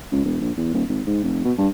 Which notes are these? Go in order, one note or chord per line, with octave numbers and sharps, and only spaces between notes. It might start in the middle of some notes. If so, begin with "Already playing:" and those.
C#2
E1
A#1
E2
D#1
G#1
G#2
F1
B2
G2